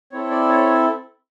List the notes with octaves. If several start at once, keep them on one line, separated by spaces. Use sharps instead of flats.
C4 E4 A4 C#5
D5
C#5